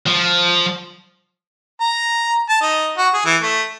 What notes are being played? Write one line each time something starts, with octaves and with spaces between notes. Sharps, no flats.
F3
A#5
A5
D#4
F#4
G#4
E3
A3